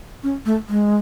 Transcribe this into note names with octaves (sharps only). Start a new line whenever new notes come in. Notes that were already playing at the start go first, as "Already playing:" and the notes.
C#4
A3
G#3